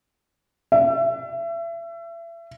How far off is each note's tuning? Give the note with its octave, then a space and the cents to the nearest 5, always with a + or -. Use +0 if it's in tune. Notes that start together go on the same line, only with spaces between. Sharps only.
E5 +30